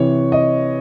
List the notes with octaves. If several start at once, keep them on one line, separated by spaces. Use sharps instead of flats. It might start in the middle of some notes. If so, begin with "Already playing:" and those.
Already playing: C3 E3 C#5
D#5